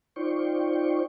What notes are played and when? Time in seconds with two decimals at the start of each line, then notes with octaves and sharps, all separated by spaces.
0.16 D#4 F4 C5 D5 G5 C#6